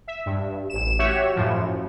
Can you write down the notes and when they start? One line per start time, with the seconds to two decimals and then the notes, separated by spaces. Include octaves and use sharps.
0.08 E5
0.26 G2
0.70 A1 E7
0.99 F#4 G4 C#5 E5
1.35 F#2 A2 F3
1.61 F#2